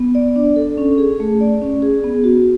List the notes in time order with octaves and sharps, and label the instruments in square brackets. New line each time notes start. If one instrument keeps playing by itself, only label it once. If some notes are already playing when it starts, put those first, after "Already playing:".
Already playing: [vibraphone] B3
D5
D4
A4
C#4
G#4
A3
D5
C#4
G#4
B3
F#4